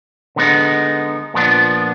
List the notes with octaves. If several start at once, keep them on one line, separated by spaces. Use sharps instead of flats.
D3 G#3 B3 D#4
A#2 F3 B3 D4